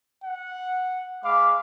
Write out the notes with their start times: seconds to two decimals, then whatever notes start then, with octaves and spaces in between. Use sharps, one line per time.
0.24 F#5
1.24 G#3 F5 B5 D6